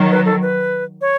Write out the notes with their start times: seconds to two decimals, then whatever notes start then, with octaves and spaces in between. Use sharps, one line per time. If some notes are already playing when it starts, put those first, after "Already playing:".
Already playing: D#3 F#3
0.11 B4
0.25 A4
0.42 B4
1.01 C#5